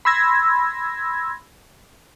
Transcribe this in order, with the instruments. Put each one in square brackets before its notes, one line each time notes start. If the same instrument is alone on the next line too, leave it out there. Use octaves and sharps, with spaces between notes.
[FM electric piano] B5 C6 E6 G#6 A#6